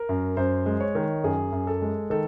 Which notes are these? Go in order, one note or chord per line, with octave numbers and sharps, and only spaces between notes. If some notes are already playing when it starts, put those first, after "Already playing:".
Already playing: A#4
F#2
F#2 C5
G#3
C#5
D#3
F#2 G#4
F#2
A4
G#3
D#3 A4